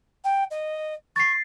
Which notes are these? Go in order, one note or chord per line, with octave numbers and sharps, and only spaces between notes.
G5
D#5
C#6 A6 C7